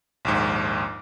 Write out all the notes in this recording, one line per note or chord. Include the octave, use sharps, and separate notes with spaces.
A#1 D#2 G#2